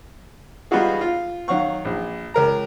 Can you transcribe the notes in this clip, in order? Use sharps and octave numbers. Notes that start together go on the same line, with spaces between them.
G3 B3 D#4 F4 F#4 G#4
F4
D#3 F#3 F5 F#5 C#6
A#1
C#2 A#4 A#5